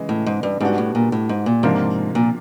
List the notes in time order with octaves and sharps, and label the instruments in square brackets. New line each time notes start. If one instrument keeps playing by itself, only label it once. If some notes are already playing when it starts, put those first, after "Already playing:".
Already playing: [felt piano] C#3 E3 G#3
[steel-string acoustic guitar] A2
G#2
G2
[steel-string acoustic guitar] G#2 [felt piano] G3 B3 D4 F#4
[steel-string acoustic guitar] A2
A#2
A2
G#2
A#2
[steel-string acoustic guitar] G#2 [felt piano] C3 F3 A#3 D4 F4
[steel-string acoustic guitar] A#2